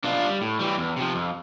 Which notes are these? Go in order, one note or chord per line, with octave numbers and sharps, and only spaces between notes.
B2 D4 F4
G3
A2
E3 G3
E2
C3 F3
F2